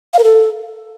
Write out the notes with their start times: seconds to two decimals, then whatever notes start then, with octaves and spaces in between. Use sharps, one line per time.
0.14 F5
0.19 A#4
0.24 A4